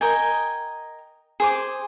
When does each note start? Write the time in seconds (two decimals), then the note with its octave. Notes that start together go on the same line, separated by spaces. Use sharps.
0.01 A#4 D#5 G5 G#5
1.40 G#4 C5 D6